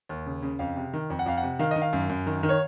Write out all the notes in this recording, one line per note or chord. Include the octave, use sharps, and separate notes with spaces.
D#2
C#3
C#3
F2 F5
C3
D#3
F2
F#5
F2 F5
F#5
C3
D#3 F5
D#3 D#5
F5
F#2
F#2
D#3
D#3
C#5